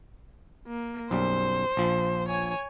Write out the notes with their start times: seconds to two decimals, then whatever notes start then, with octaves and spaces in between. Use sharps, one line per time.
0.67 A#3
1.11 B1 F#2 G3 C5
1.77 A#1 F3
2.28 C#5 G#5